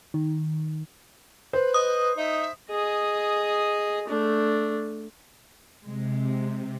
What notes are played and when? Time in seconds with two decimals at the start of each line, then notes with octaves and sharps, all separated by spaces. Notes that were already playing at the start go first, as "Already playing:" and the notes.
0.14 D#3
1.53 B4 C5
1.74 D#5 D#6
2.17 D#4 E5
2.70 G#4 D#5
4.08 A3 D4
5.84 C3 G#3